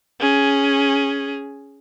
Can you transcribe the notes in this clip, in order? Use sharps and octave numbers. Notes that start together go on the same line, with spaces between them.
C#4 G#4